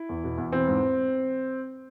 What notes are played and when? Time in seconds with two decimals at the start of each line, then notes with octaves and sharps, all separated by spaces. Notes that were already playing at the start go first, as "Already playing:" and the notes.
Already playing: E4
0.09 E2
0.24 B2
0.38 E2
0.52 E3 C4
0.68 G#2